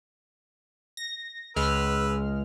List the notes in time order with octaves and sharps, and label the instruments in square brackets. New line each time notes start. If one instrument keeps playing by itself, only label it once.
[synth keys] A#6
[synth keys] C#2 G#3 F6 [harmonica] B4 E6